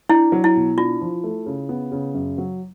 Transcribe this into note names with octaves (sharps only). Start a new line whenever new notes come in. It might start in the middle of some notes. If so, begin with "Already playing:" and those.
D4 E4
F#3
E4
B2
D4 F4
F3
A3
C#3
B3
C#3
F#2
F#3